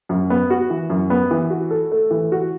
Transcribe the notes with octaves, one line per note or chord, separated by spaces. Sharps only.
F#2
B3
F#4
E3
F#2
B3
E3
F#4
A4
A3
E3
F#4